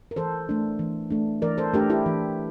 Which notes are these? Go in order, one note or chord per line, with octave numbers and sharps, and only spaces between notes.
A#4
E3 A4 C5
A3 D4
E3
A3 D4
E3 A#4 D5
A4 C5
A3 D4 G4 A#4
E4 G4
E3